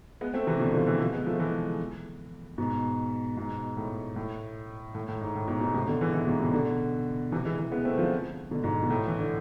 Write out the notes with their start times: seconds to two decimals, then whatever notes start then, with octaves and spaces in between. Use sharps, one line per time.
0.21 G#3 B3
0.34 A3 C4
0.47 C3 E3
0.60 B2 D3
0.73 D3 F3
0.87 E3 G#3
1.00 F3 A3
1.13 G#3 B3
1.26 F3 A3
1.39 E3 G#3
2.58 G#2 B2
3.37 G#2 B2
3.77 A2
4.16 A2
4.95 A2
5.08 A2
5.21 G#2
5.35 A2
5.48 G#2 B2
5.61 G#2 B2
5.74 A2 C3
5.87 B2 D3
6.01 E3 G#3
6.14 E3 G#3
6.27 G#2 B2
6.40 A2 C3
6.53 B2 D3
7.32 C3 E3
7.45 E3 G#3
7.58 E3 G#3
7.72 G#3 B3
7.85 A3 C4
7.98 D3 F3
8.51 B2 D3
8.64 G#2 B2
8.83 B2
8.90 A2
9.07 E3
9.19 D3